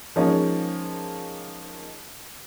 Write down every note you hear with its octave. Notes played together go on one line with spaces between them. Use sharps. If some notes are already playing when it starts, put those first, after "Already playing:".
F3 G#3 A#3 C#4 D#4